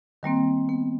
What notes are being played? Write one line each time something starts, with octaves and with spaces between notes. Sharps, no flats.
D#3 G3 A#3 C4
B3